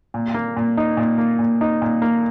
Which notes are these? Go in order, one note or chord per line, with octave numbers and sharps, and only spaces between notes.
A#2
A#3
A#2
D#4
A#2
A#3
A#2
D#4
A#2
A#3